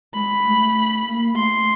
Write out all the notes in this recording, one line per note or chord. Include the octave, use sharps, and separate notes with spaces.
G#3 B5
A3
A#3
A3 C6